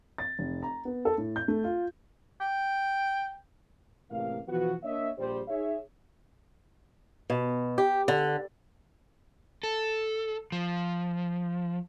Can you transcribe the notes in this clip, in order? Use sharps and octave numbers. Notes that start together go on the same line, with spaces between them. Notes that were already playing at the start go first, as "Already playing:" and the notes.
A6
F1
A#5
B3
A4
A2
G6
A3
F4
G5
A1 A2 C3 A#3 F5
B2 E3 F3 B3 F#4
A#3 D4 C#5 D#5 E5
A#1 G3 C5
D#4 G#4 C#5 E5
B2
G4
D3
A4
F3